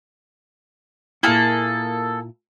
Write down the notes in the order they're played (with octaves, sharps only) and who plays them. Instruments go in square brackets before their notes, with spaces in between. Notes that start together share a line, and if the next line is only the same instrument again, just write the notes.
[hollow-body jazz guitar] A#2 E4 [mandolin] A#3 G#4 A4